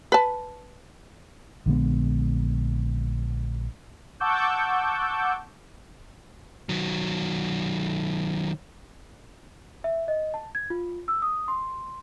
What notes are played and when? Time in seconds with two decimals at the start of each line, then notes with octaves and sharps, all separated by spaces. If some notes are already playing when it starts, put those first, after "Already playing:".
0.12 B4 A5
1.66 A#1 D3 G#3 B3
4.20 F#5 A5 C#6 D6 E6 G6
6.69 D#3 F#3
9.84 E5
10.08 D#5
10.34 A5
10.55 G#6
10.70 F4
11.08 E6
11.22 D#6
11.48 C6